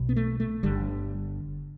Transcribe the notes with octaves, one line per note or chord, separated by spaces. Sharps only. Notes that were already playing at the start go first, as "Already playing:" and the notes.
Already playing: B1 B2
B3
A3
A3
G1 G2 D3 G3